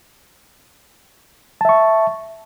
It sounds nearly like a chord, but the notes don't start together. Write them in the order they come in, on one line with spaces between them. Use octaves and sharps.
A5 E5 C#6